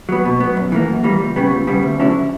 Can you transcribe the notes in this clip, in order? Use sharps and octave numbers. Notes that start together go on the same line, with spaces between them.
F#3 B3
B2
F#3 B3
F#2
E3 G3 A#3
F#2
E3 G3 A#3
C#2
C#3 G3 B3
C#2
C#3 G3 B3
D2
D3 F#3 C#4 E4